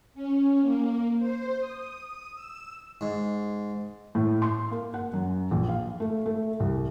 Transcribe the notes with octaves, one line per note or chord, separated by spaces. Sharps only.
C#4
A#3
C5
D#6
E6
G#2
A2
C6
A#3
F#5
F#2
A#1
F5
A3
A3
C2